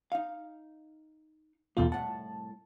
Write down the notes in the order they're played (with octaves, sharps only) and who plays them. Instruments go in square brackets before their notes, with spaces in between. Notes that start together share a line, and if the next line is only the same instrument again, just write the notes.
[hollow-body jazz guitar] D#4 F5
[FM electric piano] E2 B2 F4 [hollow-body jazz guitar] A#3 D#4 A4
[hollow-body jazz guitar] C2 A2 F#5 [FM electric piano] A5